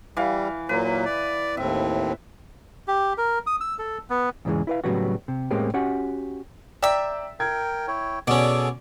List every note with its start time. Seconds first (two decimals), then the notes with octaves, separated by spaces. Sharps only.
0.17 E3 G3 F5
0.69 A#2 F#3 A#3 B4
1.05 D5
1.57 D#2 A2 C4 E5
2.88 G4
3.18 A#4
3.47 D#6
3.61 E6
3.79 A4
4.10 B3
4.45 E2 G#2 C#3 E3 G#3
4.67 E4 B4 F5
4.84 A2 C#3 F#3 G3 B3 F#4
5.28 C3
5.51 A2 G#3 A#3 C4 C#4 G4
5.74 C#4 F#4 G4 F#5
6.83 D5 E5 G5 A#5 E6
7.40 A#4 G5 G#6
7.88 E4 C#5 G5
8.27 B2 C#4 G#4 A4 D5